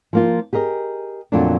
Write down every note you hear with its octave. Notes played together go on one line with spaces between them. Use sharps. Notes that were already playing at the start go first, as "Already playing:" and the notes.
F3 A#3 F4
G4 G#4 A#4 D#5
F2 A#2 D3 F#3 A3 D4